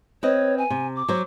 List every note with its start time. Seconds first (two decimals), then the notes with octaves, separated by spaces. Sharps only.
0.23 C4 B4 C#5 D#5
0.57 G#5
0.70 C3
0.95 D6
1.08 F#3 C5